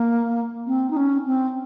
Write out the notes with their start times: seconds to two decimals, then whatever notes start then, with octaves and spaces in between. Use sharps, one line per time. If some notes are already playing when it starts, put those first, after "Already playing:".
Already playing: A#3
0.67 C4
0.90 D#4
0.96 C#4
1.26 C4